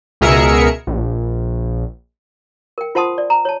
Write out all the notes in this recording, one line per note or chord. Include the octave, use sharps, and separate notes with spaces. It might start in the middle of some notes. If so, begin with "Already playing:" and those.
C#2 B2 G#4 A#4 E5 C#7
A#1
A#4 G5
F4 C5 F#5 A5 C6 D#6
D5
A#5
C#5 A5